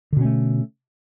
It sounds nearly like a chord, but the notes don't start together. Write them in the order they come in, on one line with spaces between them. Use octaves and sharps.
D3 B2 C#4 A3